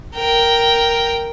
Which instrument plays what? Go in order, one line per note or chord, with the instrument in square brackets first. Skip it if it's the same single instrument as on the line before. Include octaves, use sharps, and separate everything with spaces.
[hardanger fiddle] A#4 G5